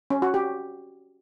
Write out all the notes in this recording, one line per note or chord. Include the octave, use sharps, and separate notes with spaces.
C#4
F#4
G4